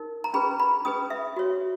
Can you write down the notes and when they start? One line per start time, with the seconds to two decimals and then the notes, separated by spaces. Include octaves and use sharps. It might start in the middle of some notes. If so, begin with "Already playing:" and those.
Already playing: D#4 A#4
0.24 A#5
0.34 C#4 G#4 B4 B5
0.60 B5
0.85 C#4 G#4 B4 D#6
1.10 E5
1.36 F#4 C#5